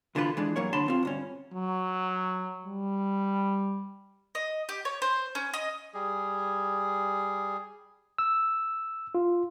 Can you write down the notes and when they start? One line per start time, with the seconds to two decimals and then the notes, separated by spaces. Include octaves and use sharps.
0.15 B1 D3 E3 F4 B4
0.37 E3 G#3 D4
0.56 G2 F#3 A#3 C#5
0.73 F#2 D3 A5 B5 C6
0.88 C4 F4
1.03 D2 G2 C#4
1.54 F#3
2.65 G3
4.35 D#5
4.69 G4
4.85 C#5
5.02 C5
5.35 C#4
5.54 D#5
5.94 G3 G#4
8.18 E6
9.15 F4